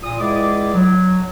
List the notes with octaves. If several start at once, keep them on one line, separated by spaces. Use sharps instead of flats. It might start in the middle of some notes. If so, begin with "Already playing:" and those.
A#2 D#6
C#2 G#3 E4 G#4 D5 D6
F#3